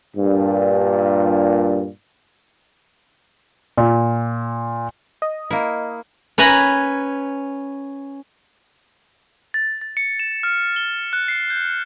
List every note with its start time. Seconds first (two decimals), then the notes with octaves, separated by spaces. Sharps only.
0.17 G2 A#2
3.77 A#2
5.22 D#5
5.51 A#3 E4
6.38 C#4 B4 G#5 A#5 B5
9.54 A6
9.81 A6
9.97 C#7
10.19 E7
10.43 F6
10.76 G7
11.13 F#6
11.28 C7
11.50 G6